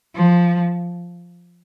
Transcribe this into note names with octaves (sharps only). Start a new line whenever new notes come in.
F3